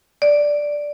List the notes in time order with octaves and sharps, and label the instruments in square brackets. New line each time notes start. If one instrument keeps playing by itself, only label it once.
[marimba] D5